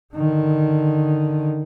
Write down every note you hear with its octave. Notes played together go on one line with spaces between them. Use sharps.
D3 D#3